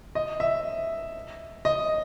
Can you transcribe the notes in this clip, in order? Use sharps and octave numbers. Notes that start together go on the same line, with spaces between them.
D#5
E5
D#5